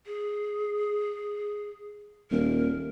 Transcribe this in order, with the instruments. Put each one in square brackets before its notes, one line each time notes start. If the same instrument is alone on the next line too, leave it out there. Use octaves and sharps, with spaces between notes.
[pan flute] G#4
[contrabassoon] D#1 [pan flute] A#4